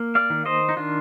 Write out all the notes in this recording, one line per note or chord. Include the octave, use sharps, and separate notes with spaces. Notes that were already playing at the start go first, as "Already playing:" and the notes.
Already playing: A#3
D5 F5
D#3
C5 D#5
D#4
D#3 D4 F4